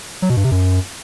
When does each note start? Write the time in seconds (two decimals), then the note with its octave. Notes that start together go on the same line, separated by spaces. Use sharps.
0.22 F#3
0.30 B2
0.37 G2
0.44 C3
0.51 F#2